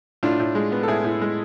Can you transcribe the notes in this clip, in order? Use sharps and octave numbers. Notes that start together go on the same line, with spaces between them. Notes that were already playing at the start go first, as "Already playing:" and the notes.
A2 D4 F4
A2
G#3
B3
A4
A2 E4 G#4
A2
G#3